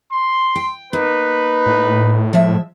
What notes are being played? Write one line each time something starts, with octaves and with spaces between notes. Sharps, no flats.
C6
G5
A#3 D#4 B4
A2
F3 G#3 E5